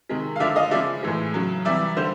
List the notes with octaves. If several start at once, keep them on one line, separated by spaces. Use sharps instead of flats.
C3 D#3 G#3
F5
D3 F3 G#3 D5 E5
D#5 F5
C#3 F3 G#3 D5 E5
A2 E3 G#3
C#3 F#3
C3 E3 G3 D5 E5
D3 G3 C5